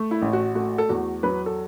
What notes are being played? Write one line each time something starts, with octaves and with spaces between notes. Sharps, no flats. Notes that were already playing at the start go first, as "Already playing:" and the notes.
Already playing: A3
E4
A1
F#4
A3 F#4
A4
E2 F#4
F#3 B4
A4